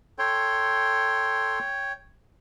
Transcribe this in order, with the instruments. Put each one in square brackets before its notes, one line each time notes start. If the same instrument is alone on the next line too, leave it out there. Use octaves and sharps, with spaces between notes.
[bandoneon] A4 C6 [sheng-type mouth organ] C#5 G5